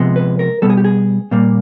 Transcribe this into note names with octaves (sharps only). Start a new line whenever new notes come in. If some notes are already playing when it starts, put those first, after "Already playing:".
Already playing: C3 F3 G#3 B3
B4
A#4
B2 G3 B3 A4
G#4
G4
G#4
A#2 G3 A#3